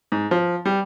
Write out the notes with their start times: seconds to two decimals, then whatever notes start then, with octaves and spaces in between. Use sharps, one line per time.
0.12 G#2
0.31 F3
0.65 G3